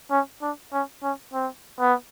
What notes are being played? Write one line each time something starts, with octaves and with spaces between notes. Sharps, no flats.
C#4
D4
C#4
C#4
C4
B3